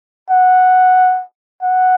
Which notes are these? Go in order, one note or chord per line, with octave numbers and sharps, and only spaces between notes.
F#5
F#5